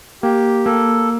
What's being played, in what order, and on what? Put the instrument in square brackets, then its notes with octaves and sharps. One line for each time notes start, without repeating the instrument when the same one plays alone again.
[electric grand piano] A#3 [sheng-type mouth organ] G4
[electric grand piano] A#3 [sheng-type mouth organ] A4